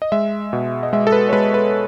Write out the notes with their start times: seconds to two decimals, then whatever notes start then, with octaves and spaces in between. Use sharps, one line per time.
0.02 D#5
0.12 G#3 E5
0.53 B2
0.83 D#5
0.93 G#3 E5
1.07 A4
1.12 B4
1.29 C#5
1.33 G#3 B4
1.54 B4